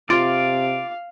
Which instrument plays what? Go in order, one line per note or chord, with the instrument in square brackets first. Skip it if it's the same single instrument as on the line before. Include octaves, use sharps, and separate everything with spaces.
[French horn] C3 [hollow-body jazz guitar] F4 [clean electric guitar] D5 [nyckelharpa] F5